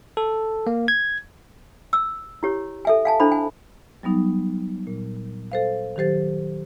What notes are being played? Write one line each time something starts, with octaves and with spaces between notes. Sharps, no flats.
A4
A#3
G#6
E6
E4 G4 C#5
A4 E5 G#5
F5 G#5 A5
D4 E4 A4 C5 B5
G#5
F#3 G3 B3 D#4
A#2
A4 C5 F5
D#3 F#3 G4 C5 A6